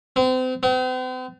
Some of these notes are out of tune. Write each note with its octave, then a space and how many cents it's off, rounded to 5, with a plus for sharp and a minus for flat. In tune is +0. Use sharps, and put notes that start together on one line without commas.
C4 -35
C4 -45